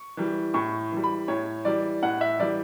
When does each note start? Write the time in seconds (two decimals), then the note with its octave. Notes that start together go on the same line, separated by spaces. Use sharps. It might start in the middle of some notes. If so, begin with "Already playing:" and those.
Already playing: C#6
0.17 E3 G3
0.54 A2 C#6
0.92 E3 G3
1.04 B5
1.28 A2 C#5
1.65 E3 G3 D5
2.03 A2 F#5
2.21 E5
2.39 E3 G3 D5